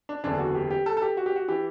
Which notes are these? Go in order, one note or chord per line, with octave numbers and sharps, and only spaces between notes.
D4
F#1 E2 D3 D4
F#4
G4
G4
A4
A4
G4
F#4
G4
F#4
E3 G4